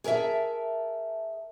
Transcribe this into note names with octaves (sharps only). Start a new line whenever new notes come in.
G#4 A#4 C#5 E5 A5